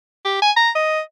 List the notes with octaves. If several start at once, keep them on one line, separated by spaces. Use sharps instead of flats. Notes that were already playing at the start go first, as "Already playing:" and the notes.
G4
G#5
A#5
D#5